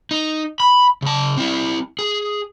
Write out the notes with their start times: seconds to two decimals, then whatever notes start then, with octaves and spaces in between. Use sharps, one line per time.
0.11 D#4
0.60 B5
1.02 C#3 A5
1.37 C4 E4
1.99 G#4